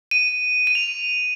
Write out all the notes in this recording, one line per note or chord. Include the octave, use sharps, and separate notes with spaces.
D#7
D#7
F7